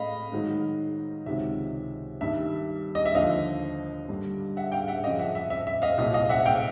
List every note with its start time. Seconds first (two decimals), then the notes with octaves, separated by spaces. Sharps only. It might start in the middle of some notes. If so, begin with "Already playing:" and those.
Already playing: A2 D#5 F5 B5
0.32 G#2 D#3 F#3
1.26 C#2 C3 D#3 F#3 E5
2.21 G2 D#3 G3 E5
2.95 D#5
3.06 E5
3.15 D#2 D3 F3 D#5 F5
4.09 G2 D3 G3
4.57 E5 F#5
4.72 F5 G5
4.88 E5 F#5
5.04 F#2 C#3 F3 D#5 F5
5.19 E5 F#5
5.35 E5
5.50 E5
5.67 E5
5.82 D#5 F5
5.98 C2 A#2 F#3 D#5 F5
6.14 D#5 F5
6.29 E5 F#5
6.45 F5 G5